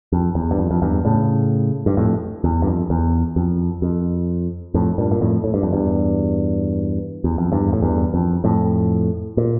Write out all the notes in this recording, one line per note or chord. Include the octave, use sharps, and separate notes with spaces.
F2
E2
G2
F2
F2
E2 G2
A2 C#3
G2
F2 A2
E2
G2
F2
E2
F2
F2
F2 A2
G2 A#2
A#2
F2 A2
A2
G2
F2
E2 G2
E2
F2
E2 G2
A2
E2 G2
F2
F2 A2
A#2